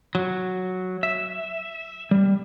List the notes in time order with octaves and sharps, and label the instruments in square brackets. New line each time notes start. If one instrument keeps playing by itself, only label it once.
[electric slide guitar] F#3
E5
G3